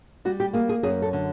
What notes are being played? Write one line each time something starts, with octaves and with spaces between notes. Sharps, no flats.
G3 F#4
G4
A#3 G#4
G#4
F#2 G#4
A4
D3